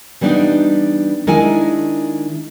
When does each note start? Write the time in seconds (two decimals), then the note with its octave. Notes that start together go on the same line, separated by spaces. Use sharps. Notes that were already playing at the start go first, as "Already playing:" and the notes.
0.21 E3 G3 B3 C4 D4 D#4
1.27 D#3 G#3 D4 E4 G#5